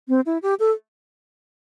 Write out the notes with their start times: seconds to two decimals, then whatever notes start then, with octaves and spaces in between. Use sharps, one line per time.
0.09 C4
0.26 E4
0.42 G4
0.59 A4